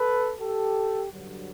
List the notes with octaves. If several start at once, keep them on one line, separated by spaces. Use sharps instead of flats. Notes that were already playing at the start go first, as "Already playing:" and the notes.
Already playing: A4 B4
G4 A4
G2 D3 F#3